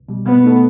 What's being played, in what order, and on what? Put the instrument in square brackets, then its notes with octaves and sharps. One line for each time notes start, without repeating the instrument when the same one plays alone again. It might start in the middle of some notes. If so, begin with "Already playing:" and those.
Already playing: [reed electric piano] C2
B2 G3
[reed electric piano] B2 [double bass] B3
[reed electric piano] A3 D#4 A4